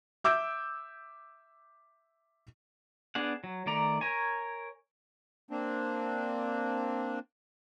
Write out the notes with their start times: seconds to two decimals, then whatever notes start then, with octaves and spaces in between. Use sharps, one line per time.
0.24 E5 D6 E6 G6 D7
3.15 B3 D4 G#4 F#5
3.44 F#3
3.66 D#3 A3 D5 A#5
4.01 A#4 C#5 G#5
5.51 A#3 C4 D4